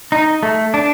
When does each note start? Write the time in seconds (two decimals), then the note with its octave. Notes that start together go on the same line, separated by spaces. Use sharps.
0.12 D#4
0.43 A3
0.74 D4